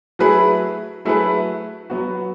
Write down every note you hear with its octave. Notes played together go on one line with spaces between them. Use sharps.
F#3 A3 E4 G#4 B4
F#3 A3 E4 G#4 B4
F#3 B3 F#4